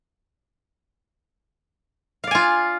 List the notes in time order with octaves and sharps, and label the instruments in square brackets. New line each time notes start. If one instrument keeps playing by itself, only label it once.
[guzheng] F5
D5
G#5
F4